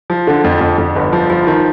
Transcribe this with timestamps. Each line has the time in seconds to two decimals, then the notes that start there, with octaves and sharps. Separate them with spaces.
0.10 F3
0.27 D3
0.44 F2
0.61 F2
0.78 F2
0.96 G1
1.13 F3
1.30 F3
1.47 D#3